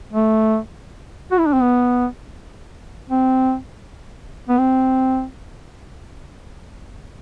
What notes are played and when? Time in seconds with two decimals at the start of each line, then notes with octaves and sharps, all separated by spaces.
0.13 A3
1.31 F#4
1.38 E4
1.46 D4
1.53 C4
1.61 B3
3.10 C4
4.48 B3
4.58 C4